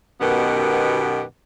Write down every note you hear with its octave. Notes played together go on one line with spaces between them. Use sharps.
F#2 B2 D#3 B3 G4